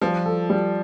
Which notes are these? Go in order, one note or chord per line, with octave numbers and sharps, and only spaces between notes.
F3 G3
A4
G3